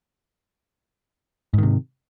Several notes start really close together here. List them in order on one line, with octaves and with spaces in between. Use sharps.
G#2 D#3 C3